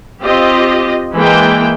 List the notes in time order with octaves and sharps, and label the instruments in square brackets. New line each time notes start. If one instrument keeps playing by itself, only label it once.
[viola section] C4 F4 G4 D#5
E3 G#3 A#3 G5